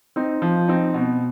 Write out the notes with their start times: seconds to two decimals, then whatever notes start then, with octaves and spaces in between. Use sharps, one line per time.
0.16 C4 D#4
0.42 F3
0.68 C4 D#4
0.94 B2